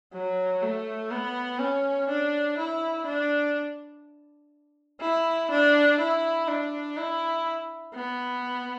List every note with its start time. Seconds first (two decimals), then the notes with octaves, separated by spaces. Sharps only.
0.14 F#3
0.62 A3
1.11 B3
1.60 C#4
2.09 D4
2.58 E4
3.07 D4
5.01 E4
5.51 D4
6.00 E4
6.48 D4
6.97 E4
7.95 B3